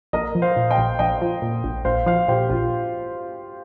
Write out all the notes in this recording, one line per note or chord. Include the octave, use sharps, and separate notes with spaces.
A#1 A#4 D#5
F3
C5 F5
A#2
D#5 G5
A#1
A#1 D#5 G5
F3
A#2
A#1
A#1 C5 F5
F3 C5 F5
A#2 G4 C5
A#1 F4